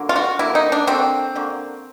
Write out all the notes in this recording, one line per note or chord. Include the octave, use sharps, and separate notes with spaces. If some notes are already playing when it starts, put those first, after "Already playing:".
Already playing: D3 F#3 A#3
F4
F#4
D3 F#3 A#3 E4
D#4
D4
D3 F#3 A#3 C4
D3 F#3 A#3